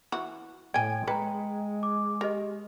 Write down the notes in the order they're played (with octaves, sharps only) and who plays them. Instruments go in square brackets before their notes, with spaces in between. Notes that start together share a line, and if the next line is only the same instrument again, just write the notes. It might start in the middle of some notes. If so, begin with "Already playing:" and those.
[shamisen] E3 F#4
[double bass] A2 [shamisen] G5 G#5 [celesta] G#6 D7
[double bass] G#3 [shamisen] B4 [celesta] G5 A#5
[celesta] D6
[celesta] G4 D#5 [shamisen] A#4